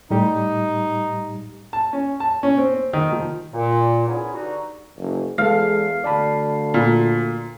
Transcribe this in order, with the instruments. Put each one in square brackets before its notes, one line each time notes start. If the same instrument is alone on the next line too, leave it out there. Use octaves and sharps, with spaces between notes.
[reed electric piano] A2 G3 G4 [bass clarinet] D#4
[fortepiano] A5
C#4
A5
C#4
C4
C4
D#3
F3
[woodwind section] A#2
B3 C#4 D#4 E4 G#4
G2 D3 D#4 F#4
[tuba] F#1
[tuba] E2 [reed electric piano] G#3 A4 [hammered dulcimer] F5
[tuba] D2 [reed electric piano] D5 A5 B5
[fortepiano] A#2